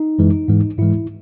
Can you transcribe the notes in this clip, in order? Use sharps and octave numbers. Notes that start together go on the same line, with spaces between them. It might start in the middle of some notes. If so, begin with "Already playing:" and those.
Already playing: D#4
F#2 E3 G#3
G#2 E3 G#3
G#2 E3 G#3 E4